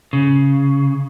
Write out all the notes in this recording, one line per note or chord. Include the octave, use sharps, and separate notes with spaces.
C#3